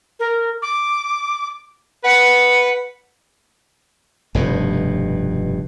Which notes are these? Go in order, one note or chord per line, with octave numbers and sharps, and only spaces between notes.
A#4
D6
B4 F#5
F1 G2 B2